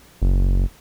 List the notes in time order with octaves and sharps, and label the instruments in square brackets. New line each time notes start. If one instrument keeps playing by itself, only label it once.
[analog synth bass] F#1